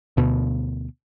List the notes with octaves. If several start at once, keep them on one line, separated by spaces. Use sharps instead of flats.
D2 B2